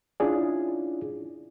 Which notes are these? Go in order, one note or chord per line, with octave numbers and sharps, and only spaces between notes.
C#4 D4 E4 F4 G#4 D5